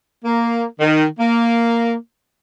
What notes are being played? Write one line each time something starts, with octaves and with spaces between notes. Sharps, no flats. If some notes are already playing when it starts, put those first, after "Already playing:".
A#3
D#3
A#3